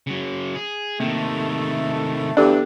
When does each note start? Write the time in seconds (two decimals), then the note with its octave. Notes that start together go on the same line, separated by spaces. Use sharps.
0.07 C#3 F#3
0.55 G#4
1.00 C3 D#3 A3 A#3
2.37 D2 G2 E3 B3 D4 G4 A4